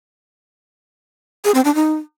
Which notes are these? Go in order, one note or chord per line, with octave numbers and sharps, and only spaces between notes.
G#4
C4
D4
D#4